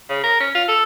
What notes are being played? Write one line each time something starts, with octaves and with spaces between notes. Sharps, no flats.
C#3
A#4
C#4
F4
A4